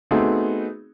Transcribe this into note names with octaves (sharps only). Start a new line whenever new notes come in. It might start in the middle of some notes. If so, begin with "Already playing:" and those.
A3 B3 C4 D#4 F#4 G#4